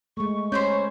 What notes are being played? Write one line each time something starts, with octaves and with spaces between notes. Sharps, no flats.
G#3 A3 C#6
C#4 C5 C#5 B5 G6